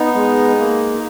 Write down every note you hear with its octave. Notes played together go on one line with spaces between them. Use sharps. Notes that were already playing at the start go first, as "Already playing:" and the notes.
Already playing: B3 D#4
G#3
A#3